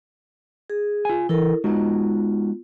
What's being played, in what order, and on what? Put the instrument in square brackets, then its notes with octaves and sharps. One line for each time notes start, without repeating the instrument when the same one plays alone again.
[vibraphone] G#4
[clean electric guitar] F4 G#5
[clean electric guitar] E3 [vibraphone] E4 A4 A#4
[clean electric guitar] G#3 D#4 F#4 [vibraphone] B3 F4